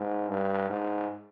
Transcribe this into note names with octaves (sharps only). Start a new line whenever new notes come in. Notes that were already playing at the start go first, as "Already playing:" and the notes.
Already playing: G#2
G2
G#2